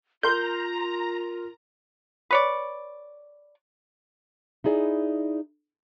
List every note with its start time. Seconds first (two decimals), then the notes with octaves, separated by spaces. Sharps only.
0.23 F4 A#4 A#5 C6 G6
2.31 B4 C#5 D5
4.64 D#4 E4 G#4 D5